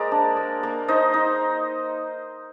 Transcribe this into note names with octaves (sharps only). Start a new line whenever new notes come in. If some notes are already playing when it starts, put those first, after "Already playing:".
Already playing: G#3 A#3 G#4 A#4 C5 D5
D4
A#3
A#3
D#4 C5 D#5
D#4